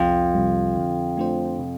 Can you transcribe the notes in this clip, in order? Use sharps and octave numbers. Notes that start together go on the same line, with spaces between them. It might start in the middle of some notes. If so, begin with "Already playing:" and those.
Already playing: C2 F2
C3 G3
D3
A3 D4 F4 C5
C3